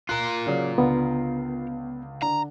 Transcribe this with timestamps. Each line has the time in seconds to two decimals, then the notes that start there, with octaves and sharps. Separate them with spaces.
0.09 F4 A#4 F#6
0.46 A#2 C#3 F#3
0.78 C#2 D3 B3
2.22 D3 A#5